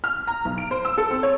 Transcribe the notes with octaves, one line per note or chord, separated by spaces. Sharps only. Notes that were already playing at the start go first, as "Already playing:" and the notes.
F6
A#5
B1
D7
C5
E6
A4
C4
C#5